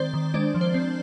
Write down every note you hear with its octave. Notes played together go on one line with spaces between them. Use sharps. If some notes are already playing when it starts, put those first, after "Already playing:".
Already playing: D#3 G#3 C4 C5 D5
D#3
G#3 D4 D5
F3
C5
C4